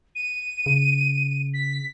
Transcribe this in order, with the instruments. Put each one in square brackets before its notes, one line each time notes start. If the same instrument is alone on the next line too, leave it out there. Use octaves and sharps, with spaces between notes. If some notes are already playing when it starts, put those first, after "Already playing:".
[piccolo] D#7
[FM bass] C#3
[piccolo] B6